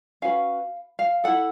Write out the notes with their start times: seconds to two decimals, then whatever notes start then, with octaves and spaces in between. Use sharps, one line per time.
0.22 C#4 F#4 B4 F5
0.99 F5
1.24 E4 A4 F#5